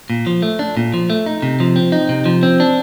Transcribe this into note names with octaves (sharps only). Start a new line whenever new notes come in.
A#2
F3
A3
D4
A#2
F3
A3
D#4
C3
F3
C4
D#4
C3
F3
C4
D4